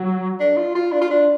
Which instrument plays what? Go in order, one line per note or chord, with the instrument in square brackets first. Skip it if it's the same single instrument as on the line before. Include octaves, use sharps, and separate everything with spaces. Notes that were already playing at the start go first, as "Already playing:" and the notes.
Already playing: [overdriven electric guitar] F#3
[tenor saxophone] D4
F4
F4
D4
F4
D4